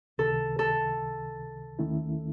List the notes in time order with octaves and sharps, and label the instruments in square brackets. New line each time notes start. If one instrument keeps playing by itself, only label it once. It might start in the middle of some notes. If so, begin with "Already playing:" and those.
[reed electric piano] C#2 C3 D#3 [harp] A4
[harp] A4
[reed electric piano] D#2 D#3 A3 C#4 E4